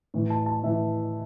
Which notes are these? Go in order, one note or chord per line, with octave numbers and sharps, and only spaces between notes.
A2 E3
A5
A5
A2 E3 E5